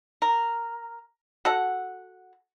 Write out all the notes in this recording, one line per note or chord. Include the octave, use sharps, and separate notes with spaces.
A#4
F#4 A4 F#5